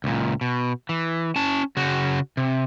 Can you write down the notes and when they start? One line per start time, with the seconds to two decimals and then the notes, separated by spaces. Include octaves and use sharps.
0.04 C#2 A#2
0.41 B2
0.89 E3
1.36 C#4 A5
1.77 C#3 F#4
2.37 C3